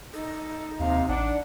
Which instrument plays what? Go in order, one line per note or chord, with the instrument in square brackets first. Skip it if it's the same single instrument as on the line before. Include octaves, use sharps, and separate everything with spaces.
[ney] D#4 [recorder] A4
[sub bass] D#2 [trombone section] C3 [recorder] F5
[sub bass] A1 [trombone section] D4 [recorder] F#5